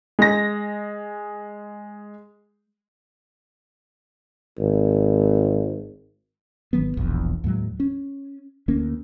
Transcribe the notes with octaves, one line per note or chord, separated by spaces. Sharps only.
G#3 A#6
G#1
G#1 D#3 F#3 B3
E1 A#1 E2
D#2 A2 F#3 G#3
C#4
D2 A#3 C#4